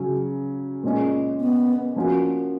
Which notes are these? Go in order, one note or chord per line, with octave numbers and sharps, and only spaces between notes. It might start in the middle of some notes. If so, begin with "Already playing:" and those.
Already playing: C#3 F#3 C#4
A#2 G#3 C#4
B3
F3 A#3 C#4 F#4 A#4